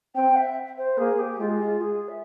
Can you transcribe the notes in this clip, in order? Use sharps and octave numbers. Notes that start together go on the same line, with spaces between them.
C4 G5
E5
C5
A#3 G#4
G4
G#3 F4
F4
G#4
E5